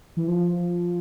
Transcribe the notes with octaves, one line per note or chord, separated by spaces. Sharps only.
E3
F3